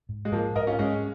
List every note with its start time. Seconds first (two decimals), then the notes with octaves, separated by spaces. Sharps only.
0.09 G#2
0.25 G#3
0.32 G#2 F3 A#3
0.56 G#2 A#4 D#5
0.67 C#4 F4
0.79 G#2 G#3 C#4